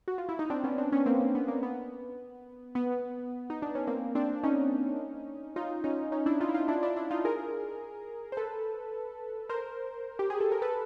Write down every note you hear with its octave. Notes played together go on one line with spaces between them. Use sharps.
F#4
F4
E4
D#4
C4 D4
B3 C#4
C4 D4
B3 C#4
A#3 C4
A#3
B3
A#3
B3
B3
D#4
D4
C#4
A#3 C4
C4 D4
C#4 D#4
D#4 F4
C#4 D#4
C#4 D#4
D4 E4
D#4 F4
E4
D#4 F4
D4 E4
D4 E4
D4 E4
D#4 F4
G#4 A#4
C5
A4 B4
A#4 C5
G4
G#4
A4
A#4
A4 B4